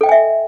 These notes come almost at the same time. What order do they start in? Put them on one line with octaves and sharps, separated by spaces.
A4 G5 D#5 G#5 E5